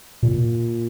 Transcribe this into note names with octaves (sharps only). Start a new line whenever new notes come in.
A#2